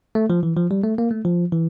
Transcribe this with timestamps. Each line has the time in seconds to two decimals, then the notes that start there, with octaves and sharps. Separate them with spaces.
0.15 A3
0.30 F3
0.43 E3
0.56 F3
0.71 G3
0.84 A3
0.98 A#3
1.11 A3
1.25 F3
1.52 E3